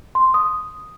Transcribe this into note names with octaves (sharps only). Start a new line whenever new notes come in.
C6
D#6